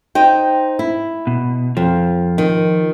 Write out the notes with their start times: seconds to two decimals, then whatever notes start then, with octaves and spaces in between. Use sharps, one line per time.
0.15 D#4 C5 G5
0.79 E4
1.27 B2
1.77 F2 F3
2.38 D#3